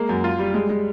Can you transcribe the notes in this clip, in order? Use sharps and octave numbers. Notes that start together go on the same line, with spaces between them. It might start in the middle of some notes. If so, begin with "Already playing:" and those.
Already playing: G#3 A#3
F#2
F4
G3
G#3
G#3